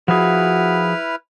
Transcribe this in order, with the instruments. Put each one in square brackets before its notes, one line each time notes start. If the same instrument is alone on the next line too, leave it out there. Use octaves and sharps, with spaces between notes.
[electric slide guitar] F3 G#4 [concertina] E4 B4 F6 [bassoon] F#4